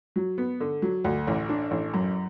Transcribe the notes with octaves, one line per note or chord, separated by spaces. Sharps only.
F#3
B3
D3
F#3
D2
A1
D4
A1
F#2